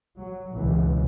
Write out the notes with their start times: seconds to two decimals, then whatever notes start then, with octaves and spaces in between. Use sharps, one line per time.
0.18 F#3
0.53 C#2 B2 E3